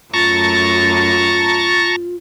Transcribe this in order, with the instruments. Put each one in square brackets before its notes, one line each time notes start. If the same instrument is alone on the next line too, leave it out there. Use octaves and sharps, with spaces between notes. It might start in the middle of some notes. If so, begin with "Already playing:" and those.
[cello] F#2 A3 [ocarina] F4 [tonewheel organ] A5 A#5 C#6 [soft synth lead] A6